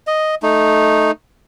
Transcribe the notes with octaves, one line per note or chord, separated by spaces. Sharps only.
D#5
A3 D#4